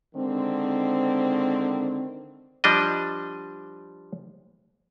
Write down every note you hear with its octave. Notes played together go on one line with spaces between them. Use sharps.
D3 D#3 G#3 C4
F3 G3 D4 D#5